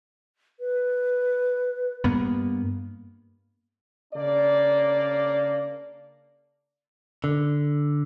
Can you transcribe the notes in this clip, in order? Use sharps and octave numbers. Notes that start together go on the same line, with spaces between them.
B4
G2 A#3 B3
C#3 A#3 D4 D5
D3